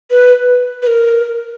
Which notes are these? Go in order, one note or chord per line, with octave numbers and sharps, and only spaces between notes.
B4
B4
A#4